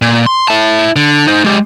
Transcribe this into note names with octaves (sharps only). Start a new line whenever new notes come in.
A#2
C6
E4 A5
D3
D#4 C5
G#3 G4